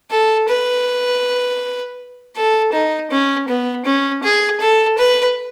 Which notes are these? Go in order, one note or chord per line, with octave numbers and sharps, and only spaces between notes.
A4
B4
A4
D#4
C#4
B3
C#4
G#4
A4
B4